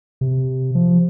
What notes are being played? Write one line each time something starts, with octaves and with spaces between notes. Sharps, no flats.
C3
F3